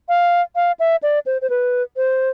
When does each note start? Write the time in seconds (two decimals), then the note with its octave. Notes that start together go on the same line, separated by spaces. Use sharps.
0.09 F5
0.55 F5
0.80 E5
1.03 D5
1.26 C5
1.42 C5
1.50 B4
1.97 C5